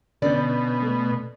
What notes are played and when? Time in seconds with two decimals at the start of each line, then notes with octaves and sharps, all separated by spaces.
0.22 B2 D3 C#4 D5 G6
0.82 A3